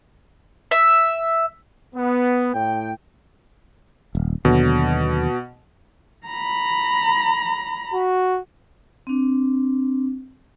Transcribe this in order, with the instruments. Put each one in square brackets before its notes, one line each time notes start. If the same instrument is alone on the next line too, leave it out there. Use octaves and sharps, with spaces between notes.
[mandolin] E5
[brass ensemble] B3
A2 G5
[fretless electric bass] D#1
[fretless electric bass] D#2 D3 F#3 [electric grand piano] B2
[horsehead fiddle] A#5 B5
[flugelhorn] F#4
[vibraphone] C4 D4